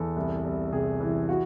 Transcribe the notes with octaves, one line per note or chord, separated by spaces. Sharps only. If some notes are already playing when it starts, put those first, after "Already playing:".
Already playing: E2 A4
C2
C2
C3 G#4
E3
F#4